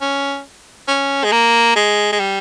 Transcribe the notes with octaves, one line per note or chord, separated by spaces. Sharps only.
C#4
C#4
G#3
A#3
G#3
G#3
G3